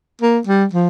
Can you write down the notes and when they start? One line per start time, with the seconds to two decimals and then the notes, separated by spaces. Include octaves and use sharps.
0.21 A#3
0.47 G3
0.73 F3